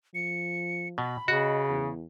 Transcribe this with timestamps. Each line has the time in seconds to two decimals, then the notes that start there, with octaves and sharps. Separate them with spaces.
0.15 F3 C#7
0.98 B2 B5
1.28 C#3 F#4 D#5
1.69 E2